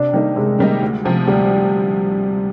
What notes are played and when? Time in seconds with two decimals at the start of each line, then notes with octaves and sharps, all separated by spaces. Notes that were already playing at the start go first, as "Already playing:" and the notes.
Already playing: C3 D4
0.13 D#3 G3 A#3 D#4
0.36 C3 G#3
0.58 D#3 G3 A#3 D#4
0.82 D2
1.05 C3 F3
1.27 D2 G3